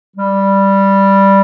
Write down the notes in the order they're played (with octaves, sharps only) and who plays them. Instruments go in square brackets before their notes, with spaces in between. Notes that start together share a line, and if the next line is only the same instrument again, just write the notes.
[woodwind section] G3